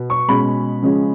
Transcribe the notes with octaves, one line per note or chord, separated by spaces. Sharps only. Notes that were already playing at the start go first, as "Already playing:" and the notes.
Already playing: B2 B3
C#6
B2 G#3 C#4 B5
C#3 F3 G#3 C#4